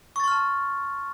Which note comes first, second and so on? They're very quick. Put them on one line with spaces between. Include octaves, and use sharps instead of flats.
C#6 A6 C6 F6 A5